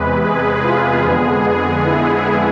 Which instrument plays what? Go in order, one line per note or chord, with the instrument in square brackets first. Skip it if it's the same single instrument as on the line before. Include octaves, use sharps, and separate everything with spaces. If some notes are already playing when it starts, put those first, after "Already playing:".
Already playing: [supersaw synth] E2 C3 G#3 B4
G#4
F4
F2 D3 G#3 B3 G#4
E4